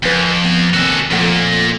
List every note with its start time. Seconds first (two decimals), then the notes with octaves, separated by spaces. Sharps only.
0.03 F2 B4 G#5
0.44 B3
0.74 D#2 C3 F#4 A4 G#5
1.11 F2 A#2 A3 F#5